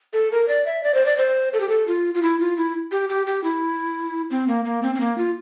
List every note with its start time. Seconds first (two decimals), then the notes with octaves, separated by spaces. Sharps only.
0.13 A4
0.32 A#4
0.48 D5
0.66 E5
0.84 D5
0.94 C5
1.06 D5
1.18 C5
1.53 A4
1.60 G4
1.69 A4
1.88 F4
2.15 F4
2.23 E4
2.40 F4
2.58 E4
2.92 G4
3.09 G4
3.27 G4
3.44 E4
4.31 C4
4.48 A#3
4.65 A#3
4.83 C4
4.95 C4
5.00 A#3
5.18 F4